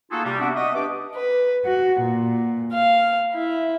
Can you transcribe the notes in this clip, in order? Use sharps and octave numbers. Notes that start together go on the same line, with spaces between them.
A#3 D#4 F4 F#4 G#4 A4
C3 G3
B3 C4 D4 F#4 D5 E5
D#5 E5 F#5 C#6 D#6
D4 G4 B4 D6
B4
F#4
A#2
F5
E4